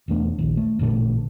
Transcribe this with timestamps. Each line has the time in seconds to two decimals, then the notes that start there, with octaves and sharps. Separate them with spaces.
0.08 E1 E2 A3 D4
0.38 A#1 D#2
0.57 A3
0.79 A1 A#2 D3 A3